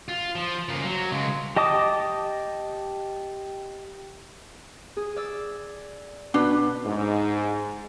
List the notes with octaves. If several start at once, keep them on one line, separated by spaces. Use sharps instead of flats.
F4
F3
C#3 A#3
F#3
C#3 G#3
G4 D#5 A5 D6 D#6
G#4
D5 E6
B2 D4 B4
G#2